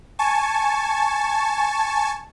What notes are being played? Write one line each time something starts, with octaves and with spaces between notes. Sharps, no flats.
G#5 A5 C#6